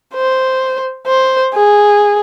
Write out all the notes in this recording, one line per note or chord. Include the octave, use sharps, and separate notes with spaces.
C5
C5
G#4